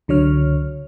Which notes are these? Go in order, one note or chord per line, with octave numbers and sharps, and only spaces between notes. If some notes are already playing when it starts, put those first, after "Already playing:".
C#2 D3 F#3 C#5 F6